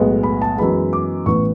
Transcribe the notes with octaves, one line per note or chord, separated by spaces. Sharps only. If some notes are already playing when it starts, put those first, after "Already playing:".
Already playing: B1 A2 G#3 B3
B5
A5
F#2 E3 G#3 B3 B5
D6
A1 A2 E3 B3 C#6